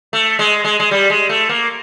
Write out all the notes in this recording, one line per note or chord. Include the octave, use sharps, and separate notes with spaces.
A3
G#3
G#3
G#3
G3
G#3
A3
A#3